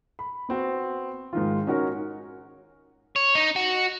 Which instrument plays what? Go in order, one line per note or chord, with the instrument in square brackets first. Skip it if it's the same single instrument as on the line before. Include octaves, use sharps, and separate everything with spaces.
[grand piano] B5
B3 C4 F#4
G#2 D#3 F4
C#4 D#4 F#4 A#4 C#5
[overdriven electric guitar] C#5
D#4
F#4